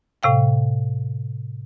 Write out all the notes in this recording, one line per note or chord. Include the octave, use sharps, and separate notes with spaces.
A2 C3 F5 G5